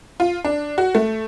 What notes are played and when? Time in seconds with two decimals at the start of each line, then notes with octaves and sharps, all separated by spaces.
0.20 F4
0.45 D4
0.78 F#4
0.95 A3